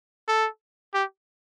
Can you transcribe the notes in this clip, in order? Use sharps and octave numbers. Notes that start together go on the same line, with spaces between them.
A4
G4